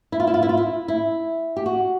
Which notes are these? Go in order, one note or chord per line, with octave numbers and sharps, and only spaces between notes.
E4
F4
E4
F4
E4
F4
E4
E4
G4
F#4